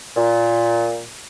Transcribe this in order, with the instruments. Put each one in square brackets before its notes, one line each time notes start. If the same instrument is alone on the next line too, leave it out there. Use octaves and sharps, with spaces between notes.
[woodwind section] A#2